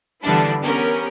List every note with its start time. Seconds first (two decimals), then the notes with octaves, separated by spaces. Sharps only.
0.22 D3 E3 G3 B3 D4 E4
0.63 B3 C#4 G4 A#4 C#5